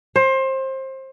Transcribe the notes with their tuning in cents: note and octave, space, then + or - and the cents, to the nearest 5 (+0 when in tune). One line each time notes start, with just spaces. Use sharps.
C5 +25